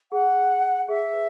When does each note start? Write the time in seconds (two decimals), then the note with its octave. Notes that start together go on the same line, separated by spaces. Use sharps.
0.12 G#4 F#5
0.88 G#4 E5
1.14 B4